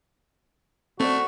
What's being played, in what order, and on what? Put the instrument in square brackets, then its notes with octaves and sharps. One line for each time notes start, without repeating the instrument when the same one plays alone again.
[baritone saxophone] A3 [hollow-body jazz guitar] C4 C5 D5 [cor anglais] F#4